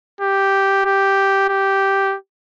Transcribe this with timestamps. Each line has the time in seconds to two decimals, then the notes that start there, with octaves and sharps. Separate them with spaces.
0.21 G4
0.85 G4
1.49 G4